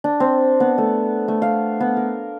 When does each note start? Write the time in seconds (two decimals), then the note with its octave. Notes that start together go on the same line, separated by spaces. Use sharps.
0.04 D4
0.20 C4
0.60 B3
0.78 A3
1.28 A3
1.42 F5
1.81 B3
1.97 A#4